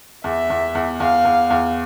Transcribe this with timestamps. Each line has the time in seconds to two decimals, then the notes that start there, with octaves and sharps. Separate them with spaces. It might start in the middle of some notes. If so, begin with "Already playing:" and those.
0.24 E2 E5
0.50 E2
0.75 E2
1.00 E2 F5
1.25 E2
1.50 E2